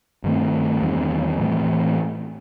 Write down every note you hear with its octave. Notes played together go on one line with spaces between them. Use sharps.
G2 D#3 A3 C4
E2 D#3 G3 C4
A2 E3 A3 C4